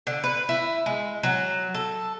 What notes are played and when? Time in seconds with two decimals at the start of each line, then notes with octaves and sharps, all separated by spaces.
0.07 D3
0.24 B4
0.49 E4
0.86 G#3
1.23 F#3
1.74 A4